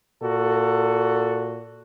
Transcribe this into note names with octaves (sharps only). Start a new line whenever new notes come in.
A#2 F#4 A4